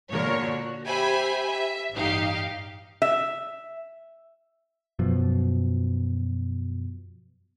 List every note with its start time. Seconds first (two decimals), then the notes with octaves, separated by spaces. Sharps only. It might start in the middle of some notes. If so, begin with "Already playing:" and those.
0.11 A#2 D3 A#4 C#5
0.42 F#4
0.86 G4 C5 E5 G5 G#5 B5
1.48 E5
1.92 A1 G2 D#4 G4 F5
3.02 E5
4.99 F#2 B2 F3